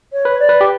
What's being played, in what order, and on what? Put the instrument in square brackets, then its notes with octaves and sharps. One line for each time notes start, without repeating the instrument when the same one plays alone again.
[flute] C#5
[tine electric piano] B4
[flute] D5
[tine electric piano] B4
G4